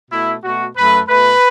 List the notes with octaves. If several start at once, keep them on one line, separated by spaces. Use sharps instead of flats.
B2 A3 E4
B2 A3 F#4
F#2 F#3 A3 B4
B2 A3 B4